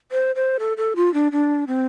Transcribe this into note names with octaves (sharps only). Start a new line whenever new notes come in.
C5
C5
A4
A4
F4
D4
D4
C4